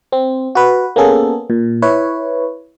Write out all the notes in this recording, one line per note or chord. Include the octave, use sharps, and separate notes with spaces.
C4
F#4 B4
A#3 B3 C#4 G#4 A4
A#2
E4 B4 C#5